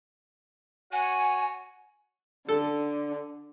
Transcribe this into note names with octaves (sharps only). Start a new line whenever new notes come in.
F#4 C#5 F#5 G#5
D3 A4